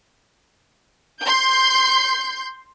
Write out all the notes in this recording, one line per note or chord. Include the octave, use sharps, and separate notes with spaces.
C6 G6